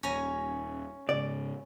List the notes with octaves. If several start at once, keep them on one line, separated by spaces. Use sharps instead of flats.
D#1 C#4 G#5 A#5
G#2 C#3 D5